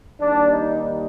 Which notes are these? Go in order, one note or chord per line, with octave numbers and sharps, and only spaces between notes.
D#2 D#3 G3 D4
D#4